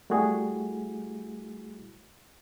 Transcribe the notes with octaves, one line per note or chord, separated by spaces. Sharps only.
G3 A3 E4 F#4 G#4